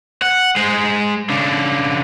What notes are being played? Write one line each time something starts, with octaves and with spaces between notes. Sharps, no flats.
F#5
G#3 C5
C#3 D4